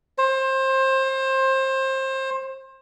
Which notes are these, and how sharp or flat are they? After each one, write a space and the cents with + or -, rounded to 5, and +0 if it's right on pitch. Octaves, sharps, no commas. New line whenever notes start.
C5 +25